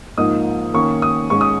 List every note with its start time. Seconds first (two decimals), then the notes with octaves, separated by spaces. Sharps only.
0.18 G#2 F3 A#3 D#4 D#6
0.74 D#3 A#3 C#4 C#6
1.02 D#6
1.30 G#2 G#3 C#4 C#6
1.41 D#6